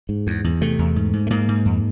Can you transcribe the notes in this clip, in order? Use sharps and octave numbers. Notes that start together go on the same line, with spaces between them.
G#2
E2
E2
C3 A3
E2
G#2
G#2
A3
G#2 A#3
G#2
F2